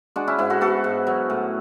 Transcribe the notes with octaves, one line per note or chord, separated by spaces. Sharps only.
G#3 D4 F#4
C#4 E4
G#2 E4 G#4
F#4 A4
B3 F#4 A4
G#2
F#3
A2